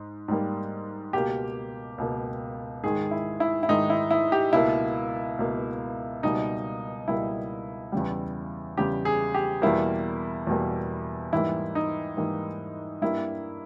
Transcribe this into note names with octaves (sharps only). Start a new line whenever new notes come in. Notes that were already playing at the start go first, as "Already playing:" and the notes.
Already playing: G#2
G#2 G3 A#3
C#2 B2 A#3 G4
C#2 B2 A#3
G#2 D#3 G#3 G#4
E4
E4
E4
G#2 D#3 G#3 D#4
E4
E4
G4
C#2 B2 A#3 E4
C#2 B2 A#3
C#2 B2 G3 A#3 D#4
C#2 B2 G3 A#3 E4
E2 C#3 G3
E2 C#3 G3 G4
G#4
G4
E2 B2 G3 A#3 E4
E2 B2 G3 A#3
G#2 E3 G3 A#3 E4
D#4
G#2 E3 G3 A#3
G2 G3 A#3 E4